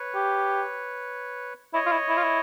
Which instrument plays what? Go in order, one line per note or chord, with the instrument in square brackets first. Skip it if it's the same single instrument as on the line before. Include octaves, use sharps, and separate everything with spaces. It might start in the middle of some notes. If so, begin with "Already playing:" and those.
Already playing: [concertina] B4 C#5
[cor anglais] G4
[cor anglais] E4 [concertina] C#5 D#5
[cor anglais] F4
E4
E4
F4
E4